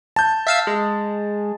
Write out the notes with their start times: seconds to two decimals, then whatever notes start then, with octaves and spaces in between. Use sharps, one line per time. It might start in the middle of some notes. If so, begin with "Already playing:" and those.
0.16 A5 G6
0.47 E5 F5 E6
0.67 G#3